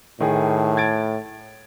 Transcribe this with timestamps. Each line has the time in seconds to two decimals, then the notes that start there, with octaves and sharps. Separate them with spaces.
0.20 A2 D#3 G#4
0.77 G#6 A6 D7